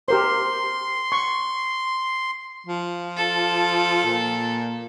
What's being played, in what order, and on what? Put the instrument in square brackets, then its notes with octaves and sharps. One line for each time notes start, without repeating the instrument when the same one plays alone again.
[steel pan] G4 A#4 C5 [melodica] C6
[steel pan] C#6
[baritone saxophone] F3
[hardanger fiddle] A4
[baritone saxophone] A#2